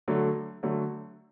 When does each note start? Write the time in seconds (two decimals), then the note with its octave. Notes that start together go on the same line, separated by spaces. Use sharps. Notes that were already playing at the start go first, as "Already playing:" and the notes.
0.08 D3 F#3 A3
0.63 D3 F#3 A3